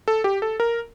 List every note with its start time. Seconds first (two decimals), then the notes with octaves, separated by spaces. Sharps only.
0.08 A4
0.24 G4
0.42 A4
0.60 A#4